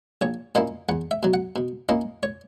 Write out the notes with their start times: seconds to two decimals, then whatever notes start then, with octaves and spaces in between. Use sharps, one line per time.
0.21 A#1 C#5
0.55 A#2 A#3 C#4 E4 D#5
0.89 E2 F#5
1.11 E5
1.23 B2 F#3
1.34 F#5
1.56 B2
1.89 A#3 C#4 E4 D#5
2.23 C#5